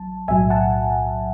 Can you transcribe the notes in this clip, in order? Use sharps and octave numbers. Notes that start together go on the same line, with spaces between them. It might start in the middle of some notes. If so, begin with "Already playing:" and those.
Already playing: A1 F#3 A5
B1 A2 F#3 E5 G#5
F#5 A5